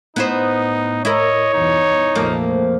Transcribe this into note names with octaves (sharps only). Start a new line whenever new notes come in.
A2 B3 D#4 E4 C5
E4 A#4 C#5 D#5
E2 G2 B2 D#4
F1 A#1 F2 F3 A3 A#3